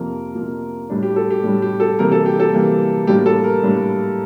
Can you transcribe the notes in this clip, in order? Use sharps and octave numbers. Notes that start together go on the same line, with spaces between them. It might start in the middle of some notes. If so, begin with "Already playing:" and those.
Already playing: F2 C3 F3 A#3 A#4
F2 C3 F3 A#3
A2 G3 D4
G4
A4
G4
A2 G3 D4
G4
A4
C3 E3 G3 A#3 A#4
A4
G4
A4
C3 E3 G3 A#3
A2 G3 A#3 D4 G4
A4
A#4
A2 G3 A#3 D4